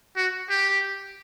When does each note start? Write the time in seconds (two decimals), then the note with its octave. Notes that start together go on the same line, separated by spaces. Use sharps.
0.16 F#4
0.50 G4